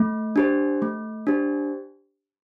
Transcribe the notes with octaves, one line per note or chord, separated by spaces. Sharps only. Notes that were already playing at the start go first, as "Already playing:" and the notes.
Already playing: A3
D4 G4 C5
A3
D4 G4 C5